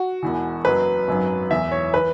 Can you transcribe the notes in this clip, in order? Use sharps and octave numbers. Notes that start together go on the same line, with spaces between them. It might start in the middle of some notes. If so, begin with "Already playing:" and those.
Already playing: F#4
E1 E2 E3
F#1 F#2 F#3 B4
G#1 F#2 F#3
E1 E2 E3 E5
C#5
E3 B4